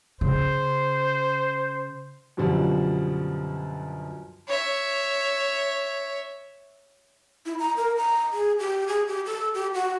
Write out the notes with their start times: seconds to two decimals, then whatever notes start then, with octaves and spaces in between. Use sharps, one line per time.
0.21 C#3 C5
2.37 F#2 B2 D3 F3 G3
4.48 C#5 E5
7.46 E4
7.59 A#5
7.77 A#4
7.97 A#5
8.33 G#4
8.59 G4
8.87 G#4
9.08 G4
9.26 A4
9.54 G4
9.74 F#4